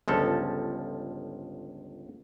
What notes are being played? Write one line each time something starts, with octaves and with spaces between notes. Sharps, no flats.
G1 C#2 F3 A4